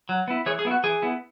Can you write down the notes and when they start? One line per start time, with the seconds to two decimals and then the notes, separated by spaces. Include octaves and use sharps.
0.09 F#3
0.28 B3 E4
0.46 E3 G#4 C#5
0.59 G#4
0.65 B3 E4
0.71 F#4
0.84 E3 G#4
1.02 B3 E4